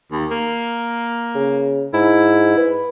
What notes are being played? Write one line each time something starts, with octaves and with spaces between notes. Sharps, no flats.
D#2
A#3
C#3
G#2 E4
B4